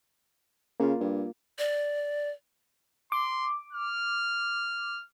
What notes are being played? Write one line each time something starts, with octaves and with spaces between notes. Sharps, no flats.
C#3 A#3 F4
G2
D5
C6 D6
F6